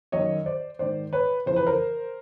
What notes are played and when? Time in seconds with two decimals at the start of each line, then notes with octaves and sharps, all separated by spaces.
0.12 F#2 D#3 C#5 D#5
0.46 C5 D5
0.79 G#2 D#3 C5 D5
1.13 B4 C#5
1.46 F2 C#3 E3 C5
1.56 B4
1.67 A#4 C5